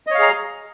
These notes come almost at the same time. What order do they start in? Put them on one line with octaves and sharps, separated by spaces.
D#5 C#5 F5 G#4 A#5